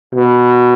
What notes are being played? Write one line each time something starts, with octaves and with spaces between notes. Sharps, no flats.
B2